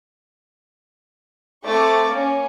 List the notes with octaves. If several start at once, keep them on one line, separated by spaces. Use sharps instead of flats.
A3 C4 C#6 D6 A6
A#3 C#4